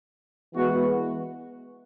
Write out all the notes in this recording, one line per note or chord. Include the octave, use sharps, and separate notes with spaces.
E3 G#3 B3 F#4